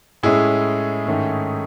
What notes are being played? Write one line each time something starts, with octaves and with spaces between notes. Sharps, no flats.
A2 G#3 C#4 E4 G#4
G#2 D#3 A3 C#4